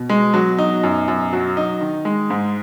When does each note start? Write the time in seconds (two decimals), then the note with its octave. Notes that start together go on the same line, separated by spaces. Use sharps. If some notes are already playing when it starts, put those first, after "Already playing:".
Already playing: B2
0.10 G#3
0.34 F#3
0.59 D#4
0.83 F#2
1.08 F#2
1.33 F#3
1.57 D#4
1.81 D#3
2.05 G#3
2.30 G#2